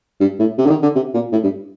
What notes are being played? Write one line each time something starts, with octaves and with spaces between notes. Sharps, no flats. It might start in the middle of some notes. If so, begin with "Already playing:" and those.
G2
A2
C3
D3
D#3
D3
C3
A#2
A2
G2